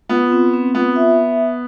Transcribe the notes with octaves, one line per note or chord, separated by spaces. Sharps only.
B3 F4
C4
C4
B3 F4
E5